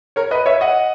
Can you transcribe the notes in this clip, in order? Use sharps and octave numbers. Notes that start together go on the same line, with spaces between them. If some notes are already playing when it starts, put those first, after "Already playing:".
A#4 C#5
B4 D#5
C#5 E5
D#5 F#5